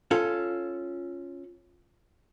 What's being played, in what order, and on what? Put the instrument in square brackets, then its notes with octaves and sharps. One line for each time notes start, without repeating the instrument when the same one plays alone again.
[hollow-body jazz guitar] C#4 F4 A4